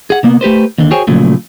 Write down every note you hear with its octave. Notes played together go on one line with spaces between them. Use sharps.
G#4 F#5
C3 A#3 B3
A3 G4 B4 C5
D#2 D3
F#4 G#4 C5 C#5 G5 G#5
A#2 C#3 F3 F#3 A3